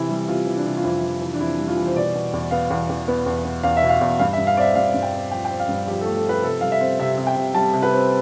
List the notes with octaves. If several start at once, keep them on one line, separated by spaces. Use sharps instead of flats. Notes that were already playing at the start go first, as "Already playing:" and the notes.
Already playing: C3 E3 E4
G3
C3 F4
E3
D4
C3
F4
F2 E4
E3
E3
D4
F2 E4
G3
F4
E3
C5
B2 D5
B2
E2
B3 F5
E2
E2
B3
E2
B3
E2 F5
E5
B2
F5
E2
G2 F5
E5
G2
F5
C4 D5 E5
G2 F5
G2
G5
C4
F3 G5
G5
C4
F5
G2
F3 G4
A4
A3
A4
F3 B4
C3 A4
G3 F5
E5
C4
C3 E5
C3
G5
C3
G3 A5
C3
B4
C4